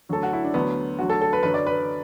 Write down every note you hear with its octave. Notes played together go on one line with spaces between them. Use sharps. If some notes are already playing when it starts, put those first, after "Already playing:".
D2 D3 F#3 A4
F#4
E4
D4
D2 D3 F#3 B3
D2 D3 F#3 F#4
A4
A4
B4
F#2 D3 F#3 B4
D5
B4